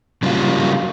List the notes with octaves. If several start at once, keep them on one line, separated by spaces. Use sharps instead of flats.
C#3 F#3 G3 A#3 F4